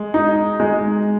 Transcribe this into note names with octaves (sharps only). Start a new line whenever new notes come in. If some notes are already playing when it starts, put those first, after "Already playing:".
Already playing: G#3
D#4
G#3